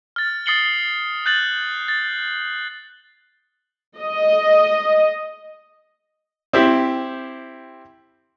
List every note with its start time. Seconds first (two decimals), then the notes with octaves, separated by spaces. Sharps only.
0.16 F6 A6
0.46 D#6 A6 C7 C#7 F#7 G7
1.26 F#6 G6 A6 F#7
1.88 A6
3.98 D#5
6.53 C4 E4 G4